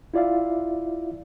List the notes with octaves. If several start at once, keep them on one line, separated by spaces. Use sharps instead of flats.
E4 F4 D5 E5 F5